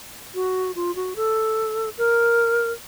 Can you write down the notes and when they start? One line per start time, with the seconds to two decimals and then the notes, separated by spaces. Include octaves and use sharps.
0.35 F#4
0.76 F4
0.96 F#4
1.16 A4
1.98 A#4